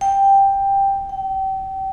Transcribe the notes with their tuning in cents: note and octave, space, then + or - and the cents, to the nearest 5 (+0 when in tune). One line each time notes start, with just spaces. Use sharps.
G5 +5
G5 -30